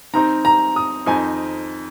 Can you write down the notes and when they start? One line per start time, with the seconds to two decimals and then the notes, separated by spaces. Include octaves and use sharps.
0.13 D#3 C4 D#4 A#5
0.45 A#5
0.76 D#6
1.06 F2 D#3 C4 D#4 G#5